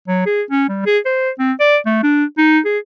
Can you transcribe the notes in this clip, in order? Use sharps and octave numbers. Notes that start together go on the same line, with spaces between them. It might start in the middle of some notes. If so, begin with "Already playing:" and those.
F#3
G#4
C#4
G3
G#4
C5
C4
D5
A3
D4
D#4
G#4